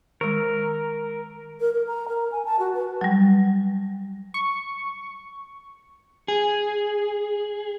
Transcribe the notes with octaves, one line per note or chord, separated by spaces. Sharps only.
D#3 G#3 A#4
A#4
A#4
A#5
A#4
G#5
A5
F#4
B4
F#3 G3
C#6
G#4